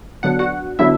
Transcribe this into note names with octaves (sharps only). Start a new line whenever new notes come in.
D3 F#3 B3 D4 F#5
F#4 F#5
D3 F#3 B3 D4 E4 E5